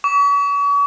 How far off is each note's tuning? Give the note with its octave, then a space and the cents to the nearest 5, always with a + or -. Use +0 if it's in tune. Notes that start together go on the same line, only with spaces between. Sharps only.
C#6 +40